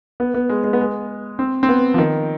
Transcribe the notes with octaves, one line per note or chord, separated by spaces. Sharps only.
B3
B3
G#3
G#3
B3
G#3
C4
C4
B3
F3
D#3